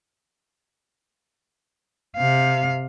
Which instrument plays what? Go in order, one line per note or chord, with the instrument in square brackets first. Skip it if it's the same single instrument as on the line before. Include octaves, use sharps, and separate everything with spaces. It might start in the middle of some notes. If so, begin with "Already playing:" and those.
[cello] C3 F5